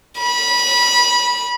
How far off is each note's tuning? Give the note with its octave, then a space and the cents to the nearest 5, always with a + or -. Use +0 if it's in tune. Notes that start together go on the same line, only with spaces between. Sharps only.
B5 -20